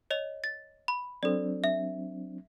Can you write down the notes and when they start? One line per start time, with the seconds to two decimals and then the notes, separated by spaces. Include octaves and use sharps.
0.11 C#5 D#5 F7
0.44 A6
0.88 B5
1.23 F#3 C4 D4 A4 D5
1.64 E5